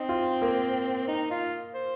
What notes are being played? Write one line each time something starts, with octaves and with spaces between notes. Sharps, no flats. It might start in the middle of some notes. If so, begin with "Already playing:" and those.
Already playing: C4 D#4
F4
A#3
D#4
F4
C5